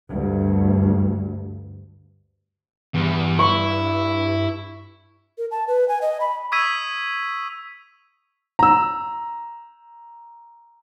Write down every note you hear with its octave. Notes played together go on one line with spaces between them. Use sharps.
D2 G2
E2 G2
E4 C#6
A#4
A5
B4
G#5
D#5
B5
C#6 D#6 E6 G#6 B6 D#7
A#5 E6